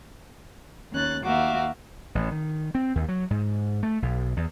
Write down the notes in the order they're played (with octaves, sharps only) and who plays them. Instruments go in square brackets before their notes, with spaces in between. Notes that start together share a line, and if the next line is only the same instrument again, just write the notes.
[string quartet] D#2 C#4 F#6 A6
D#2 A#3 F#4 E5 F5 D6
[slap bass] A1
D#3
C4
D#2
F#3
G#2
A3
B1
E2